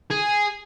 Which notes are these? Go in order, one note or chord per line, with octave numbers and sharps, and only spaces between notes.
G#4